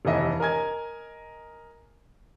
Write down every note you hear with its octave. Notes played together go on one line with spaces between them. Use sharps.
F1 D#2 E3 D#5 E5
A#4 D#5 G#5 G#6